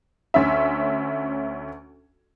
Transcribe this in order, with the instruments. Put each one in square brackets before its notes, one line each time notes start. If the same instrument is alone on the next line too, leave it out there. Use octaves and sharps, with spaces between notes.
[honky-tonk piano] D2 C#4 E5